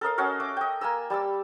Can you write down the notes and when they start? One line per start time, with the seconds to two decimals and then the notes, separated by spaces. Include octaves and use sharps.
0.01 A4 A#4 D#5 F5
0.18 C#4 F#4 D#5 F5
0.40 E5 D6
0.57 D#5 G5
0.81 A#3 G#5 A#5 E6
1.10 G3 A5 D6 E6